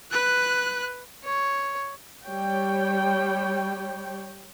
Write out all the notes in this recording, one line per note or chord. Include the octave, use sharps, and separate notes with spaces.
B4 F#6
C#5
G3 C#5 G5